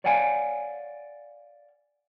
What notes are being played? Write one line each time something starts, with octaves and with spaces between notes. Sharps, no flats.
C#5 D5 F5 F#5 G#5